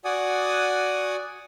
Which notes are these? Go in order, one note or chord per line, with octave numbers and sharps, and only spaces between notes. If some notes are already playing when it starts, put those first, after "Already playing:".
F#4 D5 F#5 G#5 D#6